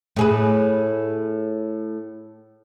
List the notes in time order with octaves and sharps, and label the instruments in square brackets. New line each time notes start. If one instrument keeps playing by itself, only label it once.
[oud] A2 G#4 B4